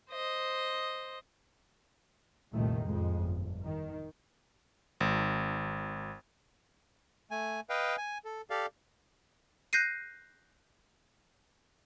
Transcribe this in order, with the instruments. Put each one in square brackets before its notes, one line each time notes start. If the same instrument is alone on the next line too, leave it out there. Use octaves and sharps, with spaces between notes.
[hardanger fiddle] C5 D#5
[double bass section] C2 F2 A#2 D#3 A3
F2 A2 G#3
G1
D#3
[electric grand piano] G#1
[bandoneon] A3 G#5
B4 D#5 F5 G5
G#5
A4
G4 A4 D5 F5
[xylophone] F#6 G6 A#6 C7 D#7